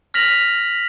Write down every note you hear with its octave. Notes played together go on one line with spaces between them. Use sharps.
F6 A#6 B6 F7 F#7